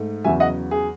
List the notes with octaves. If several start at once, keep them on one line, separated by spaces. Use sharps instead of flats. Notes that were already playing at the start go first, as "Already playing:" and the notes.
Already playing: G#2 A3
E2 C#3 F#3 E5 G#5
D#5 F#5
G#4